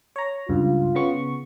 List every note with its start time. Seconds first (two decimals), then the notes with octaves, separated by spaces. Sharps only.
0.16 C#5 A#5
0.49 C#2 G2 F4
0.95 C#3 B3 C#6